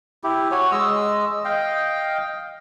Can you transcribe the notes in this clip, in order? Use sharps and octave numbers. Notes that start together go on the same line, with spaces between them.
E4 G4
F#4 C#5 G#5
G#3 D#5 E6
D#5 F5 G5